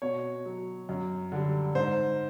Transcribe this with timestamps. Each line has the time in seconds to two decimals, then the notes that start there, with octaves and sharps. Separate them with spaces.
0.02 B2 C#5
0.45 F#3
0.89 F#2
1.32 D3 G3
1.75 G#2 C5